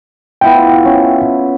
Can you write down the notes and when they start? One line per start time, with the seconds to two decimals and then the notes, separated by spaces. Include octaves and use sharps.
0.41 B3 E4 F4 G5
0.85 C#4